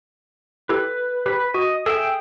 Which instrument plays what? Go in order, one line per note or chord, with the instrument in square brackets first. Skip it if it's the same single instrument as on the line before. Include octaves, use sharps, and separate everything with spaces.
[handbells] E4 G4 A4 [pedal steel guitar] B4
[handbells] G4 [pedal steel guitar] B4 B5
[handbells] F#4 [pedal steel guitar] D#5
[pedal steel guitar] G#4 E5 G5 [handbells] A4